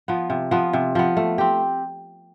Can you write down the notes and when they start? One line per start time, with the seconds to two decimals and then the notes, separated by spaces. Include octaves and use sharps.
0.08 F3 B3
0.30 C3
0.51 F3 B3
0.73 C3
0.95 F3 B3
1.17 A3
1.38 C4 G4